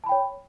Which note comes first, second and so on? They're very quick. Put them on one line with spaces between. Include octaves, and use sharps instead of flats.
A5 B5 G5 C#5